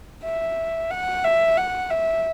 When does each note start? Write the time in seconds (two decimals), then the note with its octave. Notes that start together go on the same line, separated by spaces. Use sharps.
0.24 E5
0.91 F#5
1.24 E5
1.57 F#5
1.90 E5